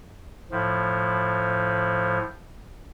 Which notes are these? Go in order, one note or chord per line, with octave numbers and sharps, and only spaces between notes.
A2 F3